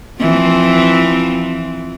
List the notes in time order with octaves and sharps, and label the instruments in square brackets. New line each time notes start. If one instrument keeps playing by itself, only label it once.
[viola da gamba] E3 F3 C4